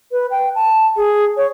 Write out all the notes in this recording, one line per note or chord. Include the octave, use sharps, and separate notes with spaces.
B4
G5
A5
G#4
C#5